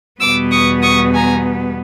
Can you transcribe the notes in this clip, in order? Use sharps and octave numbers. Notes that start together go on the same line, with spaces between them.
E2 B2 G3 B3 D6 E6
C#6 D#6
C#6 D#6
G#5 A#5